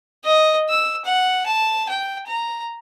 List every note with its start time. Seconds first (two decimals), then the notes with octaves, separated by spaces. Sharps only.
0.25 D#5
0.70 E6
1.05 F#5
1.46 A5
1.89 G5
2.27 A#5